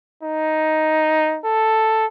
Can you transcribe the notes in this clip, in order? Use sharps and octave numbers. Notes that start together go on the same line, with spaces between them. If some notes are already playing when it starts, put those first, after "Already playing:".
D#4
A4